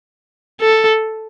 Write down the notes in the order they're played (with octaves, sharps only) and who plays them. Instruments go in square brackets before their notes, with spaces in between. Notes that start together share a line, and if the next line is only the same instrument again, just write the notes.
[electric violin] A4